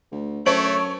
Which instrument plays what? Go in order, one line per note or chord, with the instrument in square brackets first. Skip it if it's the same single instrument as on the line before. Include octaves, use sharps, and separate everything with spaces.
[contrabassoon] D2
[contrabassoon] F#2 [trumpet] A3 [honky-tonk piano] C#5 D7 F#7